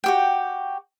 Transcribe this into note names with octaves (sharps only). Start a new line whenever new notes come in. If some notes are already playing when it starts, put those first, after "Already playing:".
F#4 G4 G5